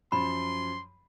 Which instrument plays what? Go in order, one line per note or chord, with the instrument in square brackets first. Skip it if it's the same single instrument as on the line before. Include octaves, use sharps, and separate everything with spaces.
[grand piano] F#2 F3 [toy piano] B5 [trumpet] C6